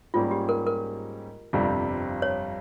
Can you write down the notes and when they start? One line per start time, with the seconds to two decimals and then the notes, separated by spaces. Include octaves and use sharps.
0.14 G#2 G3 A#3 C#4 F4
0.31 G4
0.49 A#4
0.67 A#4
1.53 G1 F2 C3 G3
2.22 C#5